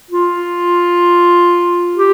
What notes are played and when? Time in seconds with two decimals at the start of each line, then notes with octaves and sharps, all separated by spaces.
0.11 F4
1.96 G4